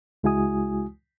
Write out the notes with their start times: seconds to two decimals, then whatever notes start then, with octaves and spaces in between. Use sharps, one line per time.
0.23 C#2 G#3 E4 F#4 G#5 D#6